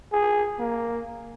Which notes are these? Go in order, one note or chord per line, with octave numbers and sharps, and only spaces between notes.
G#4
A#3